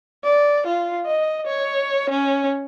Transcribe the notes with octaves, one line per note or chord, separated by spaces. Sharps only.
D5
F4
D#5
C#5
C#4